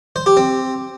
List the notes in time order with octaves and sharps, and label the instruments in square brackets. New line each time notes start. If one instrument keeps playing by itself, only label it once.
[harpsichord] C5
G4
C4